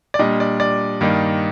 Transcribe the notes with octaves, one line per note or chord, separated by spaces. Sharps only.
D5
A#2 G3 D4 D#5
D5
D5
G2 D#3 A#3 D#4